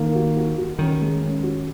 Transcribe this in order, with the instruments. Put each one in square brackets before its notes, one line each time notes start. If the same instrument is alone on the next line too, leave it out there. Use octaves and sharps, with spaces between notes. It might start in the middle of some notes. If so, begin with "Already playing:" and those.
Already playing: [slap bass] D#3 [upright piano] A#3
[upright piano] F#4
F#4
F#4
[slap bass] D#3 [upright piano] C#4
[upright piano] G#3
C#4
F#4